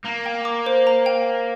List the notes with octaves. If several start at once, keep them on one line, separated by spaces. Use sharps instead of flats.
A#3 A#5
G5
D6
C5
A#5
G5